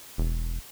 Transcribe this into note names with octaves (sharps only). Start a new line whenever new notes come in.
E1